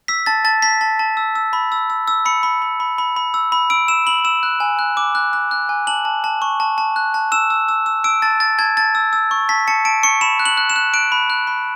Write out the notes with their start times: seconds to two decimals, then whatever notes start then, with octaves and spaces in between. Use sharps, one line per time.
0.08 E6 B6
0.26 A5 A6
0.45 A5 A6
0.62 A5 B6
0.81 A5
0.99 A5
1.17 E6
1.35 E6
1.53 B5
1.72 E6
1.90 E6
2.08 E6
2.25 B5 C#7
2.43 B5
2.62 B5
2.80 B5
2.98 B5
3.16 B5
3.34 E6
3.52 B5
3.70 E6 D7
3.88 E6 E7
4.06 B5 F#7
4.25 E6 E7
4.43 F#6
4.60 G#5
4.79 F#6
4.97 D6
5.15 F#6
5.33 F#6
5.51 F#6
5.69 G#5
5.87 A5 F#7
6.05 A5
6.24 A5
6.42 C#6
6.60 A5
6.78 A5
6.96 F#6
7.14 A5
7.32 E6 E7
7.50 E6
7.68 E6
7.86 E6
8.04 E6 D7
8.22 A5 A6
8.40 A5 A6
8.58 A5 G#6
8.77 A5 A6
8.95 E6
9.13 E6
9.31 C#6
9.49 A5 B6
9.68 A5 C#7
9.85 A5 D7
10.03 C#6 C#7
10.21 B5 E7
10.39 F#6
10.45 F#7
10.57 F#6
10.70 E7
10.76 F#6
10.94 F#6 D7
11.12 B5
11.30 F#6
11.47 B5